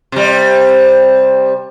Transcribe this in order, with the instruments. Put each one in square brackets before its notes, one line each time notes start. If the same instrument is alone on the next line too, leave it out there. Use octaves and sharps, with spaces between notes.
[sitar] C3 G3